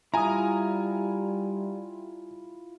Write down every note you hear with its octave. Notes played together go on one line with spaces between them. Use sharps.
G3 E4 F4 G#5 A#5 D#6